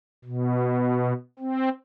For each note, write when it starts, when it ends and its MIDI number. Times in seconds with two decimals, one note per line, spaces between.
0.25 1.13 47
1.39 1.69 60